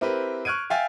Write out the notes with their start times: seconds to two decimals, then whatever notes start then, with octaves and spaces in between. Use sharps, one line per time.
0.01 C4 E4 G4 A#4 B4
0.45 C#6 F6 F#6 G#6 D7 D#7
0.70 E5 F5 G5 G#5 A6